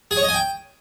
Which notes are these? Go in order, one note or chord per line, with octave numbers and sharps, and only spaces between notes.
G#4
C#5
D#5
G#5
G5